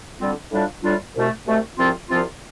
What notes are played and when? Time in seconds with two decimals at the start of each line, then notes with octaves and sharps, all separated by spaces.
0.19 D3 G3 C4 F4
0.51 A2 G3 D4 F4
0.83 A2 G3 D4 F4
1.14 C2 B2 A3
1.46 C2 B2 A3
1.77 C2 C3 F3 C4 F4
2.09 C2 C3 F3 C4 F4